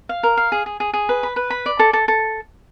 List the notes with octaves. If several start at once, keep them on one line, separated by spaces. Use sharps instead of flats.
F5
A#4
F5
G#4
G#4
G#4
G#4
B4
B5
B4
B5
D5
A4
A4
A4